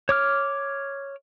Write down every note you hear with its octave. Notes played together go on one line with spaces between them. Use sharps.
C#5 D6 F6